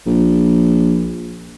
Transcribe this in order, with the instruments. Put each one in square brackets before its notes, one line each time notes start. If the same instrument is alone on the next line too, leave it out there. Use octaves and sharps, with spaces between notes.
[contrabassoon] A#1